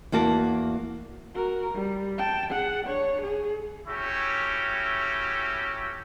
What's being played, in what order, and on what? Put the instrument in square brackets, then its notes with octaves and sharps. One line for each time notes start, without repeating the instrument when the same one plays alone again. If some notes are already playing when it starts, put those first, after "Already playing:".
[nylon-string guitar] E2 A#3 F#4 A5
[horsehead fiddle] F#4 A#4
G3
G5 A5
G#4 F#5
D4 C#5
G#4
[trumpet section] A3 C#4 E4 F#4 G4